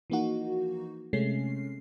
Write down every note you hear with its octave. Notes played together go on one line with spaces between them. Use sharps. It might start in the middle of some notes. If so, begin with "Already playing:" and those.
E3 F3 A#3 D#4 F#4
C3 G#3 A3 C#4 C7